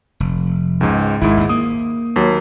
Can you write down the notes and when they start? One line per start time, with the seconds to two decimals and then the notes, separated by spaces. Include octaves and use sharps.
0.20 F1
0.81 C#2 G#2
1.21 G#1 G#2 D#3 E4
1.37 D#2 A2
1.49 A#3 D#6
2.16 D#2 F#3